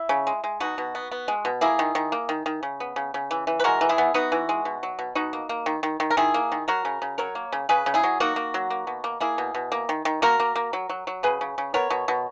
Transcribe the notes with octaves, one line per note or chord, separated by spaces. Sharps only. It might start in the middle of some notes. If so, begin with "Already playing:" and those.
Already playing: E4
C#3
G#3
G#3
B2 D#4 F#4
B2
B3
B3
G#3
B2
A#3 E4 G#4
D#3
D#3
A#3
D#3
D#3
C#3
B3
C#3
C#3
E3
E3
B4
G#3 F#4 A#4
E3
E4 G#4
B3
B3 D#4 F#4
E3
G#3
B2
F#3
B2
B2 D#4 F#4
A#3
A#3
D#3
D#3
D#3
A#4
D#3 E4 G#4
A#3
D#3
F#3 F#4 A#4
C#3
C#3
F#3 A#4 C#5
A#3
C#3
C#3 G#4 B4
C#3
E4 G#4
F#3
A#3 D#4 F#4
A#3
F#3
A#3
B2
A#3
A#3 E4 G#4
B2
B2
A#3
D#3
D#3
A#3 F#4 A#4
A#3
A#3
F#3
F#3
F#3
C#3 G#4 B4
C#3
C#3
B3 A#4 C#5
B2
B2